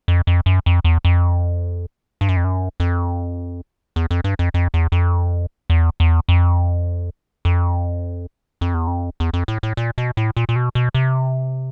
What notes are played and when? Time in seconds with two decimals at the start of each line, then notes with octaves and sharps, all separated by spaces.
0.08 F2
0.27 F2
0.46 F#2
0.66 F2
0.85 E2
1.05 F2
2.21 G2
2.29 F#2
2.37 F2
2.44 F#2
2.80 F2
3.96 E2
4.11 F2
4.24 G2
4.39 F2
4.54 F2
4.74 E2
4.92 F2
5.70 E2
6.00 E2
6.29 F2
7.45 F2
8.61 F2
8.74 E2
8.87 F2
9.20 E2
9.34 F2
9.48 A2
9.63 A2
9.77 A#2
9.98 B2
10.17 A2
10.37 A#2
10.49 A#2
10.56 B2
10.75 B2
10.94 C3